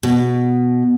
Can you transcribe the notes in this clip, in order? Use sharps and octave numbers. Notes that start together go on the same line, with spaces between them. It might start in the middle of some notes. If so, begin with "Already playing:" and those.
B2